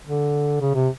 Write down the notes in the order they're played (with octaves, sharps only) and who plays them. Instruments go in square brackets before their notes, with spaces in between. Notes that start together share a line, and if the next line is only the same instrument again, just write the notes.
[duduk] D3
C#3
C3